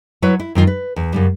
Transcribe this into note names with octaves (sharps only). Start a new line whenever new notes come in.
F#3 E4 B4 C#5
E4
F#2 D#3 F4
B4
E2
F#2 C#3 G3